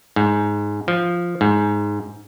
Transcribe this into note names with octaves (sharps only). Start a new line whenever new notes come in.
G#2
F3
G#2